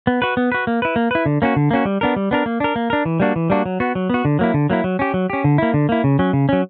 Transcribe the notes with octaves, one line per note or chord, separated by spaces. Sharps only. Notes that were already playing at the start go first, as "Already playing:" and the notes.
B3
F#4 B4
B3
F#4 B4
A#3
E4 B4
A#3
E4 B4
D3
A#3 C#4 F#4
D3
A#3 C#4 F#4
G3
B3 D4 A#4
G3
B3 D4 A#4
A#3
D4 A#4
A#3
D4 A#4
E3
G3 A#3 D4 F#4
E3
G3 A#3 D4 F#4
F#3
B3 F#4
F#3
B3 F#4
D3
F#3 A#3 E4
D3
F#3 A#3 E4
F#3
C#4 G4
F#3
C#4 G4
D3
A#3 E4
D3
A#3 E4
C#3
F#3 C#4
C#3
F#3 C#4